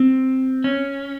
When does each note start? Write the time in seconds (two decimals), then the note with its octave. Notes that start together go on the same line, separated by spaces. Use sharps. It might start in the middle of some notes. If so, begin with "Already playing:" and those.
Already playing: C4
0.64 C#4